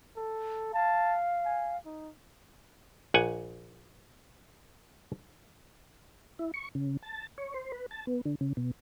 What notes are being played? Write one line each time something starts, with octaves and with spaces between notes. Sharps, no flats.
A4
F5 A5
G#5
D#4
A#1 F#5 G#5
E4
C#6
C#3
A5
C#5
C5
B4
A5
B3
D3
C#3
B2